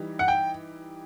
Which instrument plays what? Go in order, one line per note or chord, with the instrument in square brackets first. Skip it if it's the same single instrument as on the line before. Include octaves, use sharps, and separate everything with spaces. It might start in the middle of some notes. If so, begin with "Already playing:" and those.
Already playing: [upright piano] E3 G3 D#4 G4
[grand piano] F#5
G5